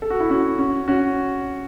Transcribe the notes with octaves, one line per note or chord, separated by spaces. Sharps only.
A4
F#4
E4
C#4 F#4
C#4 F#4
C#4 F#4